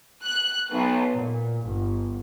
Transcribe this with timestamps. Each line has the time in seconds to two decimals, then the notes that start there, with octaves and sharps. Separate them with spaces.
0.24 F#6
0.72 B1
1.15 A#2
1.63 G1